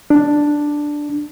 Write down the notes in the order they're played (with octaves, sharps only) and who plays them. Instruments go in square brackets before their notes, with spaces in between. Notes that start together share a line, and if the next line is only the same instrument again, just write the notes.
[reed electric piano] D4